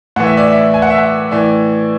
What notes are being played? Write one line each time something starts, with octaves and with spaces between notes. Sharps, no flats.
A2 E3 F#5
E5
D5
E5
G#5
F#5
E5
F#5
A2 E3 D5